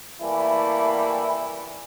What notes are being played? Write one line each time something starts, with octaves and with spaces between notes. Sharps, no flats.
E3 G3 A3 A#3 E4